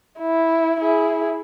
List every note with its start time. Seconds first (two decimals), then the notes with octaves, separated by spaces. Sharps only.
0.19 E4
0.79 E4 G#4